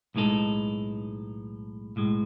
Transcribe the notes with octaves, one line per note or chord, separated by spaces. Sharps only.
B1 A2 G#3 D#4 A4
B1 A2 G#3